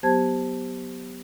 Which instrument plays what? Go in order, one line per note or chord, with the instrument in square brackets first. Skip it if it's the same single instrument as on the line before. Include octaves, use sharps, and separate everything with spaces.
[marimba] F#3 B3 G4 C5 A5 G#6